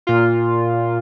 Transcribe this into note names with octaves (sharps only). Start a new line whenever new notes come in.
A#2 F4